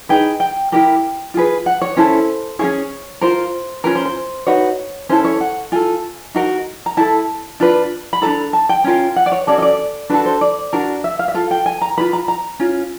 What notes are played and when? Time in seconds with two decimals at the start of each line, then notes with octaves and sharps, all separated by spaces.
0.09 D#4 G#4 B4 G5
0.40 G5
0.72 E4 G4 A#4
1.34 F4 G#4 B4
1.66 F#5
1.81 C#5
1.97 C#4 E4 A4 C5
2.59 E4 G#4 C#5
2.64 C#4
3.21 F4 A#4 C5
3.84 C#4 F4 A#4 B4
3.95 C5
4.05 C5
4.47 D#4 F#4 B4 C#5
5.09 C#4 E4 A4 C5
5.25 C#5
5.40 F#5
5.72 F4 A4 G#5
6.35 D#4 F#4 A#4
6.86 A#5
6.97 E4 A4 A5
7.60 D4 F4 B4
8.13 B5
8.22 D4 F#4 A4 A#5
8.53 A5
8.69 G5
8.84 C#4 F4 A#4
9.16 F#5
9.26 D5
9.32 C#5
9.47 C#4 F#4 A4 D5
9.58 D#5
9.62 D5
10.10 D4 F#4 A4 B4
10.26 C5
10.41 D5
10.73 D4 F#4 A#4
11.04 E5
11.19 F5
11.28 E5
11.34 F4 A4 F5
11.51 G5
11.66 G#5
11.82 A#5
11.98 F4 G#4 B4 B5
12.13 A#5
12.28 A#5
12.60 C#4 F4